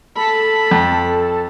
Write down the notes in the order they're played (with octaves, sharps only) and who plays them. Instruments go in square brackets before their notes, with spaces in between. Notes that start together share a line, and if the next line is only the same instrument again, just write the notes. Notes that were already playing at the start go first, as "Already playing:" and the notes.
[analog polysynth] A4 A5 [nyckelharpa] B5
[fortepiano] F2